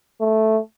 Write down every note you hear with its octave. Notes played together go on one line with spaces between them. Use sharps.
A3